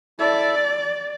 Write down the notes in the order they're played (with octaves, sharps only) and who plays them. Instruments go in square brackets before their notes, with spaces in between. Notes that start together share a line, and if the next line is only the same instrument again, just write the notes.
[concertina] E4 A4 E5 [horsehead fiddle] D5